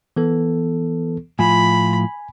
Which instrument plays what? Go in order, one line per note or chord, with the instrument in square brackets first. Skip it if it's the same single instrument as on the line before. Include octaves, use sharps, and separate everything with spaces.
[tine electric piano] E3 B3 A4
[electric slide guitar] A2 F3 F4 [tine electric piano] G#5 [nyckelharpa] B5